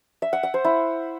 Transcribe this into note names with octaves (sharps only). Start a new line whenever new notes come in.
E5
F#5
F#5
C5
E4